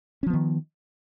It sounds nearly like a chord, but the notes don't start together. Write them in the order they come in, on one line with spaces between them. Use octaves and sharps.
C#4 F3 B3 D#3